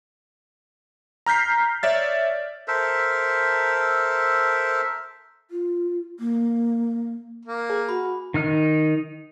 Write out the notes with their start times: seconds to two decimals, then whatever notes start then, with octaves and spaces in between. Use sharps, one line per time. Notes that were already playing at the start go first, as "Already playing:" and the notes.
1.26 A#5 F6 G6 B6 C7
1.83 C#5 D5 E5 A6
2.68 A4 A#4 C5 E5
5.51 F4
6.20 A#3
7.46 A#3
7.70 G#4
7.89 F#4 B5
8.34 D#3 D#4 F6